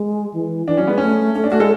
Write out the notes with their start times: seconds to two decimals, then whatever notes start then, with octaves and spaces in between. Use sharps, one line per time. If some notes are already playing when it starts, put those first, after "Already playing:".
Already playing: G#3
0.34 E3
0.67 E3 D4
0.77 F#3 C#4
0.87 G#3 B3
0.98 A3 C#4
1.35 A3 C#4
1.44 D4
1.51 A3 F#4
1.60 G#3 A4